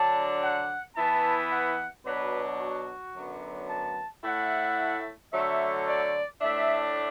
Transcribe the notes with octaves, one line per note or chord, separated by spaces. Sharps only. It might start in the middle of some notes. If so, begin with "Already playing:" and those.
Already playing: D3 F#3 D4 A5
F#5
E3 B3 E4 A5
F#5
B2 F#3 D4 B4
F#4
F#2 D3 F#3 B3
A5
A2 A3 E4 F#5
D3 F#3 A3 E5
D5
A2 A3 D4 E5